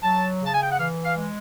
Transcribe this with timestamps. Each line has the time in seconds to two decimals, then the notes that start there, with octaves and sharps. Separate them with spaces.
0.03 F#3 A5
0.41 C#3 A5
0.54 G#5
0.62 G5
0.70 F#5
0.78 E3 F5
1.04 F5
1.16 G#3